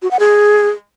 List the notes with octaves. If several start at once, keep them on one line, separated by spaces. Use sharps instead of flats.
F#4
F#5
G#4